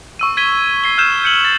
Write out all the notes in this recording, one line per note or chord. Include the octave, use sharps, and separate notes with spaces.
C#6 E6 D#7
G#6 B6 D#7 G7
B6 C7 G7
E6 F6 G6 E7
G6 C#7 F#7
G#6 A6